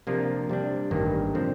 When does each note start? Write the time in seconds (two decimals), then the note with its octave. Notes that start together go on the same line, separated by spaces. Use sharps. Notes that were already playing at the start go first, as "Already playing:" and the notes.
0.07 C3 F3 A#3 D4 F4
0.50 C3 G3 D4
0.91 A1 G2 D#3 A#3
1.35 D3 F3 C4